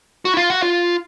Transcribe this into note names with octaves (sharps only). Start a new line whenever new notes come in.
F#4
E4
F4
F#4
F4